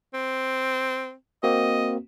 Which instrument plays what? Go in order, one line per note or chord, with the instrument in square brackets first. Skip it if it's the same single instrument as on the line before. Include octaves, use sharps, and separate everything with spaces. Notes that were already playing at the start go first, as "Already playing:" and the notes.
[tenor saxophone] C4
[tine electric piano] A#3 C4 F#4 [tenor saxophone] D#5